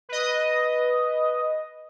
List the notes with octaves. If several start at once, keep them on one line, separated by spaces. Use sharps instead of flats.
B4 D#5